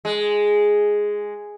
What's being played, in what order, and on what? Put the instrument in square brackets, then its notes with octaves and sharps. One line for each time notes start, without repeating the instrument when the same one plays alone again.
[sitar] G#3